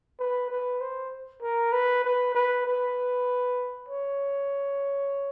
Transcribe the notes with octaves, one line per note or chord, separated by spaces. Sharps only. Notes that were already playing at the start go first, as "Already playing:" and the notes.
B4
B4
C5
A#4
B4
B4
B4
B4
C#5